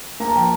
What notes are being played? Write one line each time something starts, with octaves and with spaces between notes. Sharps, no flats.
A#3 A#5
A5
F3 G5